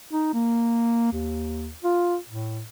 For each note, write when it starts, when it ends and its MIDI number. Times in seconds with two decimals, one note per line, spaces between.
0.13 0.29 63
0.34 1.11 58
1.12 1.71 39
1.84 2.16 65
2.29 2.62 45